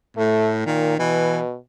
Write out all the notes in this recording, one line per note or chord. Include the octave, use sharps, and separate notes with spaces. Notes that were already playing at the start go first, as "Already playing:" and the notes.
A2 A3
A#2 D#3
B2 E3